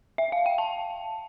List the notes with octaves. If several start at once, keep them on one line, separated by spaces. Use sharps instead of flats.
E5
F5
G5
A5